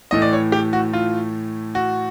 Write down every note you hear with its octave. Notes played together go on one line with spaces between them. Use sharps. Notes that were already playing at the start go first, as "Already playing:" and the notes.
A2 E3 A3 D#5
D5
C#5
G4
F#4
F4
F#4